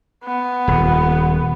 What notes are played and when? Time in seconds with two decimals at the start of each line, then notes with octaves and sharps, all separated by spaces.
0.25 B3
0.68 D#1